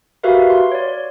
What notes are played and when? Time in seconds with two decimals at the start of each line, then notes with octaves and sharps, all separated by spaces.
0.23 F#4 G4 A#4 B4 E5 F5
0.50 C6
0.72 C#5 D5